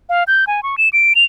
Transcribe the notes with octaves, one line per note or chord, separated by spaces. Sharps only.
F5
G6
G#5
C#6
E7
D7
F7